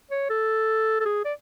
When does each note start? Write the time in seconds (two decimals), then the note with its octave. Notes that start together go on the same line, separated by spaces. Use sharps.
0.11 C#5
0.30 A4
1.01 A4
1.05 G#4
1.25 D5